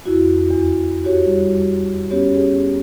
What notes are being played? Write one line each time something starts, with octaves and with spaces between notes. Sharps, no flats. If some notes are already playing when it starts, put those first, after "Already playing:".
F2 E4 F#4
E2
F#4 G4 C#5
G3
B3 C#4 G4 C#5
G4 G#4